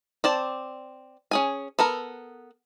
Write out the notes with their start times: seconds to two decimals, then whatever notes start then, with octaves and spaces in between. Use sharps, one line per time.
0.24 C4 D5 A5
1.31 C#4 G#4 G#5
1.79 B3 A4 A#4